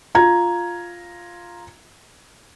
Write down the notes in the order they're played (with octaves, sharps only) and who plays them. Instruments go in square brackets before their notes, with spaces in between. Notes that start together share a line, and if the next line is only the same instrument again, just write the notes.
[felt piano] F4 A#5 G#6